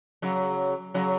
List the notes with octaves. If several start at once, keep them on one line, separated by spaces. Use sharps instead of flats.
C#3 F#3
C#3 F#3